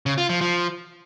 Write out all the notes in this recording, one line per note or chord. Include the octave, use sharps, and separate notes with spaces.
C#3
F4
F3
F3